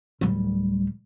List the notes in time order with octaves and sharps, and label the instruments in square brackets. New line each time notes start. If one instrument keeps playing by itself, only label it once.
[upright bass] D1 G3